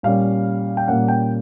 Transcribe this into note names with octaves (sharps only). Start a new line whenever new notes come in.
A#2 G3 A#3 C#4 F5
G5
A#2 G3 A#3 C#4 F#5
G5